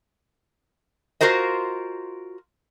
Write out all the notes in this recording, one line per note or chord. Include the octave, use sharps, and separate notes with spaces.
F4 F#4 A#4 C5 D#5